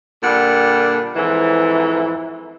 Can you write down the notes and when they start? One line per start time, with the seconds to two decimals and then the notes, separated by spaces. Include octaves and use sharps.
0.23 A#2 D3 G3 F#5
1.16 F2 G#2 E3